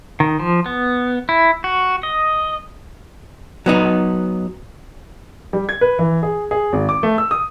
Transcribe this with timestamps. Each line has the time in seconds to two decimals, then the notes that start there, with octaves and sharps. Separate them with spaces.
0.20 D#3
0.40 F3
0.66 B3
1.29 E4
1.64 F#4
2.03 D#5
3.66 F#3 B3 D#4
5.53 G3
5.69 G#6
5.81 B4
5.99 E3
6.23 G#4
6.51 G#4
6.73 G#1
6.89 D6
7.03 A3
7.18 E6
7.31 D#6